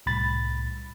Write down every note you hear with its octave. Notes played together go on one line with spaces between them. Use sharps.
C2 A2 B5 A6